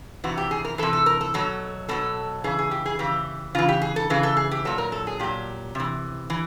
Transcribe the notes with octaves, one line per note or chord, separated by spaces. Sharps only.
C3 E3 F#4
G4
G#4
A#4
C3 E3 A4
A4
A#4
A4
B2 F#3 A4
B2 F#3 A4
C#3 E3 G#4
G#4
G4
G#4
C#3 E3 G4
C#3 E3 F4
G4
G#4
A4
C#3 E3 G#4
A4
G#4
G4
A#2 F#3 A4
A#4
A4
G#4
A#2 F#3 G4
C3 E3
E3